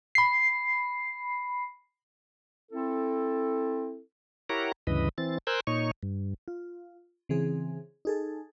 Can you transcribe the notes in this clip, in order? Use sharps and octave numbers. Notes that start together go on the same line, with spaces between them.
B5 C7
C4 E4 A4
E4 G4 A#4 C#5 F#5 A#5
D2 G2 C#3 E3 B4 D#5
E3 C4 A6
A#4 C5 G#5 E6 F#6 G6
A#2 D#4 C#5 C#6
G2
F4
C#3 E3 C4 G#4
D#4 G#4 A4